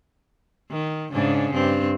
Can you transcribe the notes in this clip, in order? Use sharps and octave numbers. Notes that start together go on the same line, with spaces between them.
D#3
G#2 C#3 D4
G2 C4